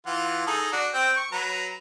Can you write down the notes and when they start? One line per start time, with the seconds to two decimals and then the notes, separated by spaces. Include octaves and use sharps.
0.06 E3 F4 F#5
0.47 D#4 G#4 A4
0.72 D4 F#4
0.94 C4 G5
1.17 C#6
1.32 F#3 B4 A#5